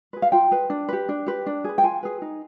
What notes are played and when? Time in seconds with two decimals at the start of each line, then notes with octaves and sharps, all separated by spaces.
0.13 G#4 B4
0.22 F5
0.32 F4 G5
0.51 G#4 B4
0.70 D4
0.89 G4 B4
1.09 D4
1.26 G4 B4
1.46 D4
1.64 G#4 B4
1.78 G5
1.83 F4 G#5
2.03 G#4 B4
2.22 D#4